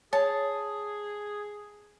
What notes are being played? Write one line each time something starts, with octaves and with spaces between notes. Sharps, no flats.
G#4 C#5 A5